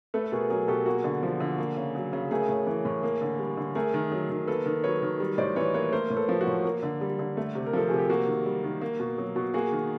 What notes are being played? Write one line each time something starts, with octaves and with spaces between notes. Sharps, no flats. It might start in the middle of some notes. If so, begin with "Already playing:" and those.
A3 A4 B4
B4
B2 G#4 A#4
F#3 G#4 A#4
B2 G4 A4
A#3 F#4 G#4
D3
F3
D3
A#3
C#3
F#3
C#3
A3 G#4 A#4
A2
E3
A2
A#3
D3
G3
D3
A3 G#4 A#4
D#3
F#3
D#3
A#3 A4 B4
D#3
F#3 B4 C#5
D#3
G3
A2 C5 D5
E3 B4 C#5
A#3 B4 C#5
A3 A#4 C5
A2
A4 B4
F3
F#4
A2
A#3
D3
G3
D3
A3
C3
A#4
F3 A4
C3 G#4
G4
A#3 F#4
D#3
G3
D#3
A#3
B2
F#3
B2
A#3 F#4 G#4
D#3